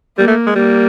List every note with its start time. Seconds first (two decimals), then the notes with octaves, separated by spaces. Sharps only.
0.18 G3 A#3
0.27 A3
0.47 G#3
0.55 G3 A#3